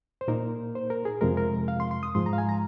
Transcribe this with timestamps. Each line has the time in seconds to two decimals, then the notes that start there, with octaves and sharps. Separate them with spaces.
0.21 C5
0.28 A#2 A#3 D#4 A#4
0.75 C5
0.90 A#4
1.05 G#4
1.21 F2 C3 F3 G#3 A#4
1.37 A#4
1.68 F5
1.80 C6
1.91 C6
2.03 D#6
2.15 G#2 F3 G#3 C6
2.26 A#5
2.33 F5
2.38 G#5
2.49 A#5